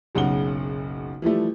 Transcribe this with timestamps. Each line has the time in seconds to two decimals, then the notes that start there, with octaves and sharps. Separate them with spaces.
0.15 F#1 B1 C#3 F#5 G7
1.22 E3 F3 G3 A3